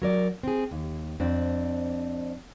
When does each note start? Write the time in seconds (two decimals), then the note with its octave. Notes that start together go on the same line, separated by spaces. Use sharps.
0.02 F#3 A#4 D5
0.43 C4 G#4
0.71 D#2
1.20 F2 C4 D4